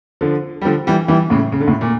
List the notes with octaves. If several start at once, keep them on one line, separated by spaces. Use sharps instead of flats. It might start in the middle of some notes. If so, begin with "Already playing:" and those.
D3 F3
G3
D3 F3
E3 G3
E3 G3
A2 C#3
C#3
D3
A2 C#3
A#2